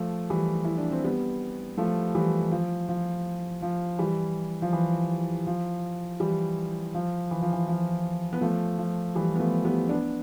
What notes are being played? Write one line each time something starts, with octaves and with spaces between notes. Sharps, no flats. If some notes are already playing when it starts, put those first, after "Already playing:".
Already playing: F3 A3
E3 G3
E4
D4
C4
G3 B3
F3 A3
E3 G3
F3
F3
F3
E3 G3
F3
E3
F3
E3 G3
F3
E3
F3
E3
F3
B3
F3 A3
F3
E3 G3
B3
F3 A3
G3 B3
B3 D4